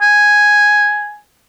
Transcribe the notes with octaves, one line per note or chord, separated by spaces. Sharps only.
G#5